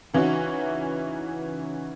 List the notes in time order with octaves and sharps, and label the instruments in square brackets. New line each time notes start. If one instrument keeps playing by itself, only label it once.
[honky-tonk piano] C#3 E3 C#4 D#4 E4 F#4